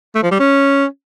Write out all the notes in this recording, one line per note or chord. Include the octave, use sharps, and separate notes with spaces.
A3
F3
G3
C#4